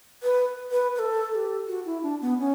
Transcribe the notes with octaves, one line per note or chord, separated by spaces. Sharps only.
B4
B4
B4
A4
A4
G4
F#4
E4
D4
B3
C#4